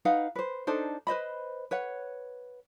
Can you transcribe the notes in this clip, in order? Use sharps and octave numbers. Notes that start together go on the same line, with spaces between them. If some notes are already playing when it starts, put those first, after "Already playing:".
D#4 B4 F5 F#5
B4 C5
D4 D#4 A4 C5
B4 C5 D#5 B5
B4 C#5 F#5